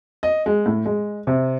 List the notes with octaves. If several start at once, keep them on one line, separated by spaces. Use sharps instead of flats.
D#5
G#3
A2
G#3
C3